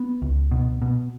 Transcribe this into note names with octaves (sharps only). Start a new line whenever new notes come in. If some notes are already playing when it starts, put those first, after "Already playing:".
Already playing: B3
C#2
B2
B2